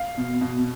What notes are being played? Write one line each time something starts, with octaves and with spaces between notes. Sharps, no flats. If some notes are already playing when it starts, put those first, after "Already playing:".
Already playing: F5
B2
B2